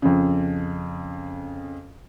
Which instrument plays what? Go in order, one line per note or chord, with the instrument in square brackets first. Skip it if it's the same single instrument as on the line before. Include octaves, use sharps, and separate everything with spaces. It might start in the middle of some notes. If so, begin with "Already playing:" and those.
[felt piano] F2 C#3